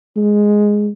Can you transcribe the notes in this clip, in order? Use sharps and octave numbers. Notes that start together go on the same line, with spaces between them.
G#3